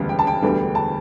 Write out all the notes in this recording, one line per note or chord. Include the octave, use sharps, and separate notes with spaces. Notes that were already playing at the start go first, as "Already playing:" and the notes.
Already playing: E1 D2 C#3 G3 B3
G5
A5
G5
E1 D2 D3 G3 B3
A5